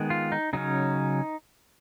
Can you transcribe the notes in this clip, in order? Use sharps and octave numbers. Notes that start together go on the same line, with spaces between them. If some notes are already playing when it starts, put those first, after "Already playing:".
Already playing: D#3 G#3 B3
F4
D#4
C#3 F#3 C#4 D#4